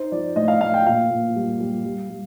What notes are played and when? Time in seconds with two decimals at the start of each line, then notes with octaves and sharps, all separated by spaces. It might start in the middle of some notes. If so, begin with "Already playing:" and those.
Already playing: D#4 C5
0.12 F3 D5
0.36 A2 D#5
0.48 F5
0.61 A2 F5
0.74 G5
0.86 A#2 F5
1.10 A#2
1.36 G3
1.60 G3
1.85 G3
2.10 G3